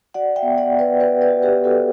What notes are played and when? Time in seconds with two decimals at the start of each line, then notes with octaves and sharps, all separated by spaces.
0.14 F#4 D5 F#5
0.36 E5 G5
0.43 B3
0.58 D5 F#5
0.72 B3
0.79 B4 D5
1.00 F#4 B4 D5
1.22 B4 D5
1.29 F#4
1.43 G4 B4
1.57 B3
1.64 F#4 A4